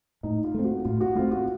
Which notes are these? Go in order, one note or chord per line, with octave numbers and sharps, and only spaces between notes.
A2 D#4
F4
A3 C4
F#4
A2 F4
F#4
A3 C4 F4
F#4